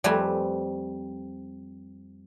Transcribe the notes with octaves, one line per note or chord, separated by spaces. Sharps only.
F2 G3 A3 C4 B4 G#5